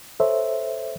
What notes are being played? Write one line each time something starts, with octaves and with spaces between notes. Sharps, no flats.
A4 C5 C#5 E5